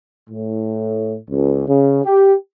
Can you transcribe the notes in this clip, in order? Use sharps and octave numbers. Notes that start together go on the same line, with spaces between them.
A2
C#2
C#3
G4